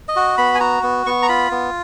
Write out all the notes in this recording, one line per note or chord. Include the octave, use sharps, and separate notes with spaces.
D#5
F#4
B3 B5
G#5
F#4 A#5
B3
B3 C#6
A#5
F4 B5
B3